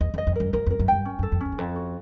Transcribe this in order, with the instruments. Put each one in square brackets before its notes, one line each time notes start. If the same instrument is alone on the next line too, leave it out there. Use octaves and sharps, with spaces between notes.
[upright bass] E2 [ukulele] D#5
[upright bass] F2
[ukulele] D#5
[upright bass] F2
[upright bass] F#2 [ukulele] A#4
[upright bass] F2 [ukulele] A#4
[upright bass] F2 [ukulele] A#4
[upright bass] F#2
[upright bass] G2 [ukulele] G5
[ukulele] C#4
[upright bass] F#2 [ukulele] A4
[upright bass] F2
[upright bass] E2 [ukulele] C#4
[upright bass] E2
[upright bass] F2 [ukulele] A4
[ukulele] F#4